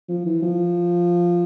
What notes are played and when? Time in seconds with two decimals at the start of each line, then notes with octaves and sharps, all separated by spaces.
0.09 F3
0.26 E3
0.42 F3